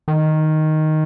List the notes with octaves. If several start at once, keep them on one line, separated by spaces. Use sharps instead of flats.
D#3